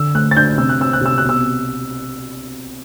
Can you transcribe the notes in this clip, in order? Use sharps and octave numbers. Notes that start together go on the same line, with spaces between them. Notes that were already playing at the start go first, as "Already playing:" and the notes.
Already playing: D3 E6
A3 F#6
A6
D4 G6
C3 E6
F#6
C4 E6
F#6
C3 E6
B2 F#6
E6